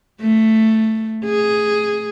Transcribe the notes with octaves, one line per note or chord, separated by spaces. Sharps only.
A3
G#4